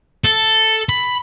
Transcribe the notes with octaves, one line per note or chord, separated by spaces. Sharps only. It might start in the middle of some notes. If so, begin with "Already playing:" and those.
A4
B5